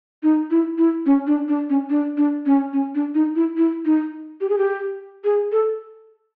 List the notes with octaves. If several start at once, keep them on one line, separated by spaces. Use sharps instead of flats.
D#4
E4
E4
C#4
D4
D4
C#4
D4
D4
C#4
C#4
D4
D#4
E4
E4
D#4
G4
G#4
G4
G#4
A4